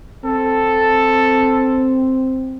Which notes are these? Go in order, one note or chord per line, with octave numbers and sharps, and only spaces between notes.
C4 A4